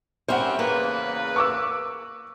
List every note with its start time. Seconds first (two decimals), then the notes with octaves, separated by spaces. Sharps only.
0.28 G3 C4 C#4 A#4 C5 E5 F#5
0.59 E2 C#3 A#3 B4
1.36 C#6 D6 E6